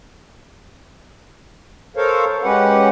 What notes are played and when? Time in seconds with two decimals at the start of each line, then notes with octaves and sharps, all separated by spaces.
1.97 A4 A#4 C5 C#5 F5
2.43 G#3 C#4 G4 B4 F#5